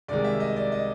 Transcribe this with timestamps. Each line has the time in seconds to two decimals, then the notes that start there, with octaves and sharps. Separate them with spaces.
0.08 C2 C3 D#3 G#3 D5
0.24 E5
0.40 D#5
0.56 D5
0.72 D#5